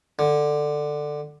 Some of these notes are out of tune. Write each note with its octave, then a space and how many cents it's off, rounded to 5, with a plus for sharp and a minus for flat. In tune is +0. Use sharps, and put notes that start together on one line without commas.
D3 +10